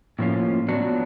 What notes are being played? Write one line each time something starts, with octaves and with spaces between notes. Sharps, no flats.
A2 F3 A#3 C#4 F4
F#3 B3 D4 F#4